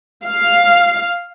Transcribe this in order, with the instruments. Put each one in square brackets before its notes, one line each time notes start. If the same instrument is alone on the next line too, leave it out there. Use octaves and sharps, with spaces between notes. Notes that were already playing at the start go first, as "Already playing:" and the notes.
[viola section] F5